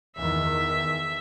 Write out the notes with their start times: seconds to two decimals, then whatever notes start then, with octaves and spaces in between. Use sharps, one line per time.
0.17 E2 D#3 E5